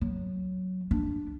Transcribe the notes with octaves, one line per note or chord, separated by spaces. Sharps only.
F#3
D4